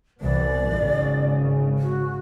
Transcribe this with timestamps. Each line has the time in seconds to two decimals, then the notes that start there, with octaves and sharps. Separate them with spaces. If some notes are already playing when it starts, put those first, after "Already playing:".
0.21 C2 E3 B3 D5
0.75 G#1 C#3
1.79 F#4